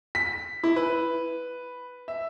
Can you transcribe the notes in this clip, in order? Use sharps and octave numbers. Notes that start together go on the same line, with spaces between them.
B6
E4
B4
E5